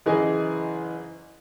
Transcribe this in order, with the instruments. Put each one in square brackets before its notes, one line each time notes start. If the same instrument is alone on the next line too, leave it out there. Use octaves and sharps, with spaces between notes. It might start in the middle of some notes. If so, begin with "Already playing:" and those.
[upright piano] F#1 E3 G#4 D#5 G#5